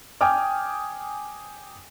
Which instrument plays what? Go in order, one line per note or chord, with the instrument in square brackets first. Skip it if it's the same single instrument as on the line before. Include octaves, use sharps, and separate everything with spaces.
[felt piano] G5 G#5 D6 D#6 F6